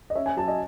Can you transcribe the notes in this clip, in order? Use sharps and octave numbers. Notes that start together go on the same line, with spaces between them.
D#5
C#4 E5
G#5
F#3 A5
D#5